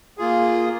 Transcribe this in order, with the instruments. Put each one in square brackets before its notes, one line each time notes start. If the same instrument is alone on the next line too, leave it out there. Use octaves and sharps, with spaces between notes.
[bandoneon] A#3 F4 G#4